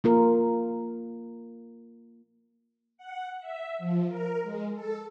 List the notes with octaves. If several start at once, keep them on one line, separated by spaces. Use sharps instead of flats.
A#3 F4 A#4
F#5
E5
F3
A#4
G#3
A4